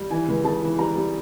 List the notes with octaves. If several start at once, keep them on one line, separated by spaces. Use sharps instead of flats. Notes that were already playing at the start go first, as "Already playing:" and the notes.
Already playing: G3
E3 G#5
C#2
C#3 A5
E3
G3 A#5
G3